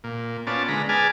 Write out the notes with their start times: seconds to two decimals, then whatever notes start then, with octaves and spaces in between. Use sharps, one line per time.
0.04 A#2
0.47 B3 C#4 F4 D5 A5
0.68 D3 G#3 A#5 B5
0.89 G#4 B4 G#5 A5 D6 F6